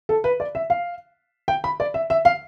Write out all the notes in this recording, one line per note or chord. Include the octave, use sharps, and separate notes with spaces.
A4
B4
D5
E5
F5
G5
B5
D5
E5
E5
F5